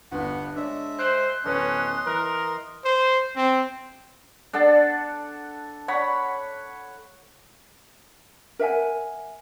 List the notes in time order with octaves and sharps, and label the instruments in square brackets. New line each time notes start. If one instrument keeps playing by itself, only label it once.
[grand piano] G1 G2 [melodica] B3 F#5
[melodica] G#3 E5 [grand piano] D4 C#5
[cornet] C5 [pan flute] F#6 [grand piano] C7 D7 F#7
[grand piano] D1 B3 A4 [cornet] C#4 [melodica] D#5 C6
[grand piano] E3 [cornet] A#4
[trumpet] C5
C4
[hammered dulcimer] D4 A4 F#5 A5
C#5 F#5 B5
[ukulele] A#4 E5 F#5 G#5